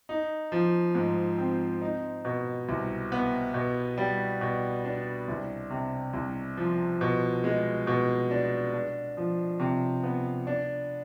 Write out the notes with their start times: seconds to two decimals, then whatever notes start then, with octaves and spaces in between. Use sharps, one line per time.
0.09 D#4
0.52 F3
0.95 G#2
1.38 C4
1.81 D#4
2.25 B2
2.69 C2
3.12 B3
3.54 B2
3.98 G3
4.41 B2
4.85 D4
5.28 C2
5.70 C3
6.13 C2
6.57 F3
7.01 B2
7.44 G#3
7.87 B2
8.31 D4
8.74 D4
9.17 F3
9.60 C3
10.04 B3
10.47 D4